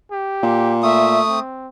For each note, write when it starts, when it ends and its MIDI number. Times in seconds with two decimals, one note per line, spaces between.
0.11 0.77 67
0.43 1.22 46
0.83 1.40 57
0.83 1.24 76
0.83 1.40 87
1.29 1.68 60